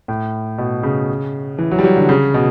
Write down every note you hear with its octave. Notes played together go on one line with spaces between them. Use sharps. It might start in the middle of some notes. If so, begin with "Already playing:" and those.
A2
B2
C#3
E3
F#3
G3
F#3
D3
C#3
B2